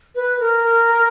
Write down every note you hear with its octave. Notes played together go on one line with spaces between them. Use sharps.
B4
A#4